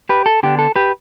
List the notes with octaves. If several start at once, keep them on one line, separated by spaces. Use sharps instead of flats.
G4 B4
A4
D3 B3 D4 G4
A4
G4 B4